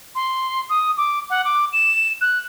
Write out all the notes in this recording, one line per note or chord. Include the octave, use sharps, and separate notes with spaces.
C6
D#6
D6
F#5
D6
E7
F#6